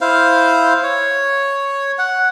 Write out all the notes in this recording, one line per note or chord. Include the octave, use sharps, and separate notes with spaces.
E4 C5 F5
C#5
F#5